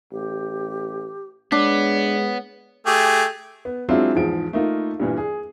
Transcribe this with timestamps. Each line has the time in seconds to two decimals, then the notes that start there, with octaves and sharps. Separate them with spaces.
0.12 A1 G4
1.52 G#3 B3 D4 C#5
2.86 A3 G4 G#4
3.65 B3
3.89 F#3 G#3 C4 D4 E4 F4
4.15 E2 G#2 F3 D7
4.53 A3 A#3 D#4 F4
5.00 G2 A#2 E3
5.18 G#4